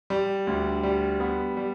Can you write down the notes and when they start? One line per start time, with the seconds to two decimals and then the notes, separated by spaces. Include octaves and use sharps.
0.10 G3
0.47 D2
0.83 G3
1.20 B3
1.57 G3